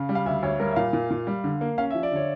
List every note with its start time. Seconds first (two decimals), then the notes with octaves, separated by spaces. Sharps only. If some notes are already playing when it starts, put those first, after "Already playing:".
Already playing: C#3 F5
0.09 G3
0.15 F5
0.26 D2 E5
0.43 D2 C#5
0.60 G3 A#4
0.71 E5
0.76 A#2 F5
0.93 A#2
1.10 A#2
1.27 G3
1.44 D3
1.61 A#3
1.78 C#4 F5
1.90 E5
1.95 F3
2.03 D5
2.12 D3 C#5